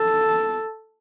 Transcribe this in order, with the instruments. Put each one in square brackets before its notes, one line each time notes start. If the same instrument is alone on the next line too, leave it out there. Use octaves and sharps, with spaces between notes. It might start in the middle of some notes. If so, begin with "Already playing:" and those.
Already playing: [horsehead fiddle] A4